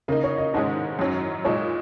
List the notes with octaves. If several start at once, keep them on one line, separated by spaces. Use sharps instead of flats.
C#3 A#3 D#4 A#4
C#5
D#5
G#2 D#3 G#3 C#4 D#5
F#2 D#3 F#3 C#4
A#2 G#3 D#4 C#5